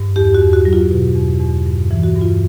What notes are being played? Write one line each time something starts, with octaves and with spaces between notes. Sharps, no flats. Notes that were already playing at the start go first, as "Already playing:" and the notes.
Already playing: G2
E2 G4
F#4
E2
F#4
F#3
F4
B2
E2
E2
G2
E3
F#4
G2
F4